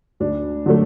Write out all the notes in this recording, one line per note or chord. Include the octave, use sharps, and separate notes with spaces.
D2 D4
D3 F#3 A3